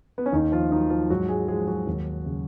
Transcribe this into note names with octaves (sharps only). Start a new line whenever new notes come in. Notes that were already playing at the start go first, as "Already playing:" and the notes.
B3
C#4
D#2 D#3 D#4
F3 F4
D#3 F#3 D#4
F3 F4
G#2 F#3 F#4
G#3 G#4
F3 G#3 G#4
F#3 F#4
D#2
C#3 F#3